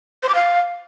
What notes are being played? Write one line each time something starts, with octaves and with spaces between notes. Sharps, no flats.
C5
D6
F5